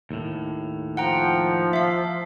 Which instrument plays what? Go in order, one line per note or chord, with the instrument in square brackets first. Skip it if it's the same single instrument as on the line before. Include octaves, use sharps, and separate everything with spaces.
[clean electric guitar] D#2 A2
[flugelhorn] F3 [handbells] F#5 G5 A#5
[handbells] E5 F5